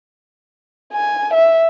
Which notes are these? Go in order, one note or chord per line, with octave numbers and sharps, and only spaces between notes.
G#5
E5